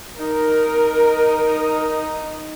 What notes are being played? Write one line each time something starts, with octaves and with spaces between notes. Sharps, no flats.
D#4 A#4